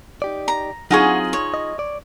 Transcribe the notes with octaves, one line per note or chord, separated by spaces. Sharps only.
D#4 G4 D5
A#5
F#3 C4 D#4 F4 G#4 F#5 G#5 C#6
C#5
D#5
D5